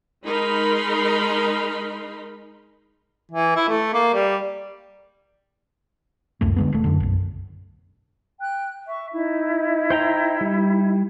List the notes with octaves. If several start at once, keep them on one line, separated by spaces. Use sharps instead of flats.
G#3 D#4 A#4 B5 C6
E3
E4
A3
A#3
G3
D1 C2 F#2 A3
D3 G#3 B3
E1 A3
F#2 D3
B1 F#2
G5 F#6
E5 C#6
D#4 E4 E5
C5 G5 A#5
G3